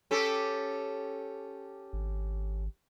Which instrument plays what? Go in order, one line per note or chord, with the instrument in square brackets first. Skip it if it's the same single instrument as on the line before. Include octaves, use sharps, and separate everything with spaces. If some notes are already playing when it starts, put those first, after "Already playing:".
[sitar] C#4 G4 A4
[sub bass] G#1